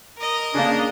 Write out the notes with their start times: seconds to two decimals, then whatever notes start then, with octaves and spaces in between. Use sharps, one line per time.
0.18 A#4 D#5
0.54 C#3 A#3 D4